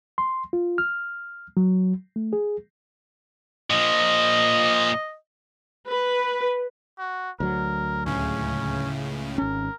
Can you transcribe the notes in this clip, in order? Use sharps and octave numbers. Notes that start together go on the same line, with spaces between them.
C6
F4
F6
F#3
A3
G#4
A#2 F3 D#5
B4
F#4
D2 F#3 A#4
C#2 A2 C#3 C#4
G#1 C#4 A#4